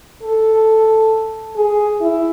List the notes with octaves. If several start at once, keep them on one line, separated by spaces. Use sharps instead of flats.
A4
G#4
E4